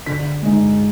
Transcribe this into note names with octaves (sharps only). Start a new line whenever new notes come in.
D3 B6
G#3 D#4